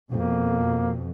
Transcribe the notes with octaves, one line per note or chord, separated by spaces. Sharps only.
F2 B2 A#3